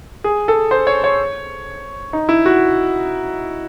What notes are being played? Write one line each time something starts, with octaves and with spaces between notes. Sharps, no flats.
G#4
A4
C5
C#5
C#5
D#4
E4
F#4